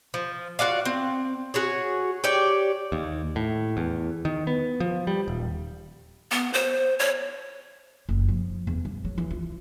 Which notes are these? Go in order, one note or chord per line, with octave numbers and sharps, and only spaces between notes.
F3
F4 F#4 D5 F5
C4
F#4 G#4 C#5
G4 C#5 D5 G5
D#2
A2
E2
D#3
B3
F3
G3
D#1
B3
C5
C#5
F#1
F3
E2
G2
F#3
E3
F4